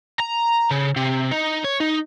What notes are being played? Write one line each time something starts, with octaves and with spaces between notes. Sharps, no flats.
A#5
C#3
C3
D#4
C#5
D#4